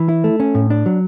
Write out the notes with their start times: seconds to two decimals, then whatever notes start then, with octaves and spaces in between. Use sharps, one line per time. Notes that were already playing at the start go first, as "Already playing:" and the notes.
Already playing: E3
0.09 E4
0.24 A3
0.40 C#4
0.55 A2
0.70 D4
0.86 F#3